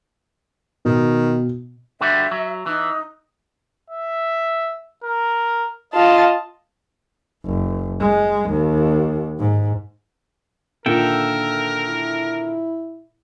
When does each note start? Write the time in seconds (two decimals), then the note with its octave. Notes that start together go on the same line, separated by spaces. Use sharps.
0.85 B2 D#3
2.01 D3 G3 F#4 E5
2.31 F#3
2.66 E3 D#4
3.90 E5
5.04 A#4
5.94 F4 D#5 A5
7.45 F#1
8.00 G#3
8.50 D#2
9.39 G#2
10.86 A#2 D3 D#3 A4 A#4 E5 G5
11.89 E4